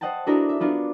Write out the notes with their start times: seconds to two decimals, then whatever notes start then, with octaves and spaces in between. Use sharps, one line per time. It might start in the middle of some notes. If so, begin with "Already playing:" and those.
0.01 C5 D#5 F#5 G5 A5
0.27 D4 E4 F#4 A4 A#4 D#5
0.49 E5
0.60 B3 D4 F4 A#4